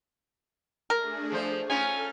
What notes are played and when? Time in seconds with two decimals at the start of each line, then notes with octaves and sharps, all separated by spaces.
0.90 A3 D4 G#4 A#4
1.32 F3 C5
1.70 C#4 D#4 F4 A4 G#5 F6